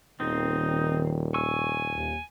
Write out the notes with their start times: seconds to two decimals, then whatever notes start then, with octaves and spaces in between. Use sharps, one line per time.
0.20 D#1 D#3 C4 D#4
1.34 G#5 C#6 E6
1.92 D#2